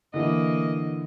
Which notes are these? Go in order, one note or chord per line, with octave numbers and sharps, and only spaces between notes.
D3 E3 A#3 D#5